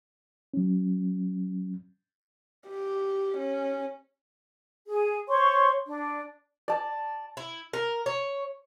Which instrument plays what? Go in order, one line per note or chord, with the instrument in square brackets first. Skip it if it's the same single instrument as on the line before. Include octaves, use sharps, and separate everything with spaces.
[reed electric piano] F#3 C#4
[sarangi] G4
C#4
[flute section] G#4
C5 C#5 C6 C#6
D4
[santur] D5 A5
[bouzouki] E4
A#4
C#5